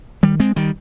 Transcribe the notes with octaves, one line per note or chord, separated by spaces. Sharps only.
D#3 G3
G#3 C4
D#3 G3